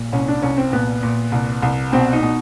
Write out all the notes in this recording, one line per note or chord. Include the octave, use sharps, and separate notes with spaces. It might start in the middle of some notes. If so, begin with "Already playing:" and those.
Already playing: A#2
C2 C#4
D4
C2 C#4
C4
A#2 B3
A#2
C2
C2
B2 C4
D#4
B2